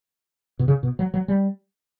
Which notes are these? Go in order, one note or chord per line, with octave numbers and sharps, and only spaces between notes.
B2
C#3
B2
F#3
F#3
G3